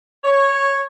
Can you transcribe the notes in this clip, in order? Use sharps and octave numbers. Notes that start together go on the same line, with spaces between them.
C#5